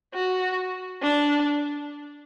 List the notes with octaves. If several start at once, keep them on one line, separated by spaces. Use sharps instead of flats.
F#4
D4